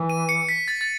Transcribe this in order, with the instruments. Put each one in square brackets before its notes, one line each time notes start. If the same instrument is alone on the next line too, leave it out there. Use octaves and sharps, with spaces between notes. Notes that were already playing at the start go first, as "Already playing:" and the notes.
Already playing: [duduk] E3
[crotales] D#7
C#7
B6
A6
A6